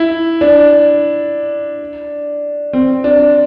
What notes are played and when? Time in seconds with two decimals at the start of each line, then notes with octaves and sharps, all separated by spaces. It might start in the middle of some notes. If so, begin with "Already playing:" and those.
Already playing: E4
0.41 D4
2.73 C4
3.04 D4